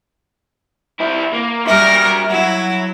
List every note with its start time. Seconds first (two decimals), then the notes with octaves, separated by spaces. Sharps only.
1.00 C4 E4
1.33 A#3
1.67 G3 F#4 A#4 E5
2.30 F#3 E4